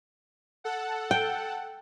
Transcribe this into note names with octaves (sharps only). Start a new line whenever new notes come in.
A4 F#5
G5